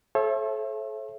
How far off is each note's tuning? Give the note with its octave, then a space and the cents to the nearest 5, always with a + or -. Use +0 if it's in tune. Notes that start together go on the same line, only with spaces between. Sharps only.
A4 -30 C#5 -45 E5 +20